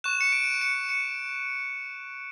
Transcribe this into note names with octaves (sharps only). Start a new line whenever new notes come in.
C#6 F#6 E7
C#7
D7
C#7
C#7